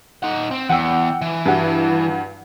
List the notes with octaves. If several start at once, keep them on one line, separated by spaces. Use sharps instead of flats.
D#4 F#5
C4
E2 F#5 G5 E6
E3
G2 F#4